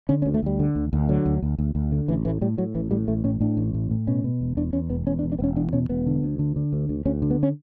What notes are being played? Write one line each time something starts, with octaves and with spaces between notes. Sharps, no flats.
D3 C#4
C#4
D2
A3
D2 G3
D3
D2
D2
D3 F#3
D2
D2
D2
D2
D3
A1 E3
A2 E3
A2 G3
A2 F#3
A1 E3
A2 G3
A1 A3
A2 C#4
A2 D4
A1
A2
A2
B2 C#4
B2
E1
E2 D4
E2 C#4
E1 B3
E2 C#4
D4
E1
D4
E1 B3 C#4
E2 D4
B2 C#4
E1 B3
D3
D2
D3
D3
D2
D2
D2 C#4
D3
B3
C#4